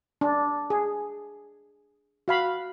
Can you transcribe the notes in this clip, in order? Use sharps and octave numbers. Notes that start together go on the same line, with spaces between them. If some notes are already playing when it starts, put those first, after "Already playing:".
D4
G#4
F#4 F5 B5